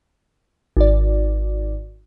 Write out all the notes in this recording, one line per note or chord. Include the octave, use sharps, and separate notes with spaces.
G#1 D5